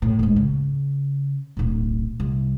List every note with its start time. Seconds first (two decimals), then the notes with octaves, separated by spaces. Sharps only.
0.02 A2
0.19 D1 G#2
0.36 C#3
1.57 D1 B1
2.20 C2